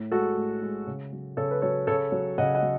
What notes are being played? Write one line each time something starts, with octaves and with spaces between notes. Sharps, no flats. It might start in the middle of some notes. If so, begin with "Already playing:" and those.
Already playing: A2
G#3 F#4 A4
A2
G#3
C#3
F#3
C#3 A4 C#5
B4
F#3 A4 C#5
C#3 A4 C#5
F#3
C#3 D#5 F#5
D#5 F#5
F#3